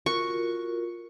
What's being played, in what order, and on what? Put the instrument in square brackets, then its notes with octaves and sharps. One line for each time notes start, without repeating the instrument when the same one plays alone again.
[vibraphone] F4 F#4 A#4 [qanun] C#6